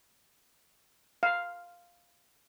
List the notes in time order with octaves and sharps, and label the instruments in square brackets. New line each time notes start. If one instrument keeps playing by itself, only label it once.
[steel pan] F5